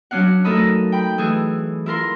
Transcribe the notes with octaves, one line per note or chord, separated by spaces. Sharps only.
F#3 C#4 D4 F5 F#5
A3 D#4 A4 A#4 D#5 B5
G5 B5
E3 A3 G#4
E4 F4 A#4 C6